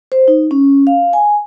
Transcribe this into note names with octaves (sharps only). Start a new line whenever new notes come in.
C5
D#4
C#4
F5
G#5